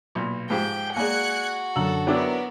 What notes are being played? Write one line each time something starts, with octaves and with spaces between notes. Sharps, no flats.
B1 A#2
G#2 F3 G4 G5
G#3 A#3 F#4 D5 G#5 F#6 G#6 C#7
F#2 D3 A4 E6 F#7
F#3 B3 D4 E4 A#4 E5 G5 D6